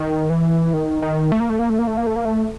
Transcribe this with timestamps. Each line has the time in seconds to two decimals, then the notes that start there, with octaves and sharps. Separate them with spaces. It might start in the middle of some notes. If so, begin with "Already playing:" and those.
Already playing: D#3
0.30 E3
0.73 D#3
1.02 D#3
1.32 A3
1.40 A#3
1.49 A3
1.59 A#3
1.70 A3
1.79 A#3
1.87 A3
1.97 A#3
2.07 A3
2.16 A#3
2.25 A3